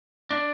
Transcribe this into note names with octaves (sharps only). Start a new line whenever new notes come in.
D4